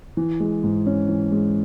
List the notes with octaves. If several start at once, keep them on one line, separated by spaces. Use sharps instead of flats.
E3
G#3
G#2
C#4
E3
G#3